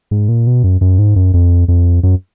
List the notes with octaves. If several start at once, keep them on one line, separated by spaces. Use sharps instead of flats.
G#2
A#2
B2
F#2
F#2
G#2
F#2
F2
F2
F#2